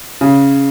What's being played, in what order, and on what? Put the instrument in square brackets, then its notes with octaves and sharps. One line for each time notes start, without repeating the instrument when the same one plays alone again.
[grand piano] C#3